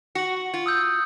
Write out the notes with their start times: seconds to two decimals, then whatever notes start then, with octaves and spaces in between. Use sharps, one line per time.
0.15 F#4 C#7 F#7
0.54 F4
0.66 D#6 E6 G6